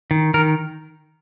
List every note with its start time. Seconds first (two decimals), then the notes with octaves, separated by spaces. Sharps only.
0.11 D#3
0.34 D#3 A#4